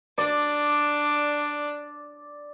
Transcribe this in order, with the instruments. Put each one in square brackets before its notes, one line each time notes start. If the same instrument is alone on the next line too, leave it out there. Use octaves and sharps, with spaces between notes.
[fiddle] D4 [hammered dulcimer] D5